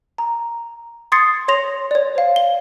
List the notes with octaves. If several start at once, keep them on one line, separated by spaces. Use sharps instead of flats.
A#5
C6 D#6 G#6 A6 C7 C#7
C#5 C6 A#6 F7
C#5 D5
C5 F5
G7